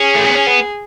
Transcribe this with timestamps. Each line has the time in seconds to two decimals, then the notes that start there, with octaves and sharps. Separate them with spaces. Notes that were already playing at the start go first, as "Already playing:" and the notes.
Already playing: C#4 G#4
0.15 A3
0.24 B3
0.35 C#4
0.47 B3